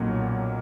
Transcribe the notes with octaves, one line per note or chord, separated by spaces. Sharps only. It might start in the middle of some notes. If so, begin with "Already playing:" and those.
Already playing: B1 A#2 F#3 A#3 C#4